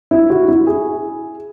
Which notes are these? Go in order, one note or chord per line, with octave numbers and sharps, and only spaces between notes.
E4
F#4
E4
G#4